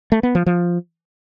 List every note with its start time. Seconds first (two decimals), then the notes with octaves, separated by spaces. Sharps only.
0.12 A3
0.23 B3
0.35 F3
0.46 F3